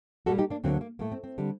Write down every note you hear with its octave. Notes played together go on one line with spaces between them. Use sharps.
A#2 G3 A#3 F#4 A4
D#4 G4
A#3 D4
D2 D3 F#3 A#3 C4
A#3
A2 A3 A#3
C4
C4
D3 G3